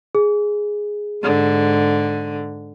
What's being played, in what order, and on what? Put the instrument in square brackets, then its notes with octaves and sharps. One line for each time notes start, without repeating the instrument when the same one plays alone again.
[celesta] G#4
[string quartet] G#2 D3